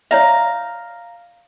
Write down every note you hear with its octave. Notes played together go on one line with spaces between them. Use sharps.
C#5 D5 E5 F5 A#5